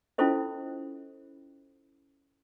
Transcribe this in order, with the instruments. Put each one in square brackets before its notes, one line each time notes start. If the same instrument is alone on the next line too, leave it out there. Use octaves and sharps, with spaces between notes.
[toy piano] C#4 E4 F4 A4 C5 D#5